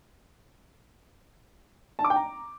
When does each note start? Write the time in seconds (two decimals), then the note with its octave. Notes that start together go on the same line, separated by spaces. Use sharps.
1.99 A5
2.05 D6
2.10 G5
2.16 A#5